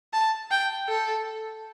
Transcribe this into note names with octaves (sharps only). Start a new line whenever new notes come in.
A5
G5
A4